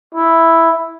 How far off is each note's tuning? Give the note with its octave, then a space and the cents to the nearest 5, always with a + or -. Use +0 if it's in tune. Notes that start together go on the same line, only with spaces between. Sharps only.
E4 +0